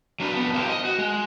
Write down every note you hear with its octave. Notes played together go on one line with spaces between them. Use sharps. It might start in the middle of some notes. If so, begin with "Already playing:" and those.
F#3 D4 B4
F2 B3
A#3 B3 E4 F#4 G4 C5
D#5
F#4
G#3